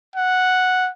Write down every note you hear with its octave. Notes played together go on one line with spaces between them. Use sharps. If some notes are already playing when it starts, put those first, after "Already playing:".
F#5